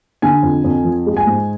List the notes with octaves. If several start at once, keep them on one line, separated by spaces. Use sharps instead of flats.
D3 G#5
F2
F2
F3
G#3
G#5
G#2